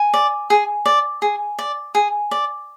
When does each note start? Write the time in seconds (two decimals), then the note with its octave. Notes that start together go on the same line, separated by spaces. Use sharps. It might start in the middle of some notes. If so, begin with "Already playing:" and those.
Already playing: G#5
0.14 D5
0.50 G#4
0.86 D5
1.22 G#4
1.59 D5
1.95 G#4
2.31 D5